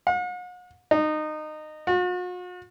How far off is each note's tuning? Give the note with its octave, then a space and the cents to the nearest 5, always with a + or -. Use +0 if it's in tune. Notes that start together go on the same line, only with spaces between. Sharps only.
F#5 -45
D#4 -20
F#4 -45